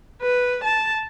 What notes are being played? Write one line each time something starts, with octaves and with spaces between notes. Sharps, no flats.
B4
A5